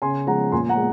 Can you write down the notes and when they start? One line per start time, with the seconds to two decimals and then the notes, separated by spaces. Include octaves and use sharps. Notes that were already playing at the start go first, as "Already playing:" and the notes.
0.02 C#3 G#5 C6
0.27 F3 G#3 F#5 A#5
0.52 A#2 G#5 C6
0.69 F#5 A#5
0.77 G#3